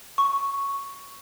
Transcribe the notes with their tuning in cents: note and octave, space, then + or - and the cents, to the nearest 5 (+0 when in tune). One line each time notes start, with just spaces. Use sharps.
C#6 +0